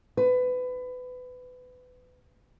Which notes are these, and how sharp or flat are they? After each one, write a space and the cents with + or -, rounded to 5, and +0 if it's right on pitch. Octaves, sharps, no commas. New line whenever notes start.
B4 +25